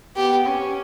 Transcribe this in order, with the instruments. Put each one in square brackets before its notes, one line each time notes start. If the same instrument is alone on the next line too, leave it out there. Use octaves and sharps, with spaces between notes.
[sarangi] B3 [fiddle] G4
[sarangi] C#4